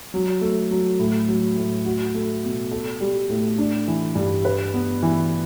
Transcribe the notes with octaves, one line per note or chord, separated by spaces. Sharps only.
F#3
A3
F#3
A2
F#3
A2
F#4
A3
B2
A4
G3
A2
D4
E3
G2
B4
B3
E3